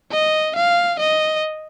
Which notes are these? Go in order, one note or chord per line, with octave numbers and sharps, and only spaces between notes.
D#5
F5
D#5